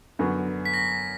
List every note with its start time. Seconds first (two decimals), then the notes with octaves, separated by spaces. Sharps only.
0.19 F#2 D3 F#3 B3
0.66 B6
0.74 A#6